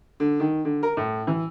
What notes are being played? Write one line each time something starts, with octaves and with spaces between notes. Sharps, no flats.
D3
D#3
D3
A#4
A2
E3